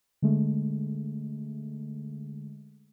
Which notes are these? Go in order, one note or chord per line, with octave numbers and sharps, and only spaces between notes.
D3 G#3 A3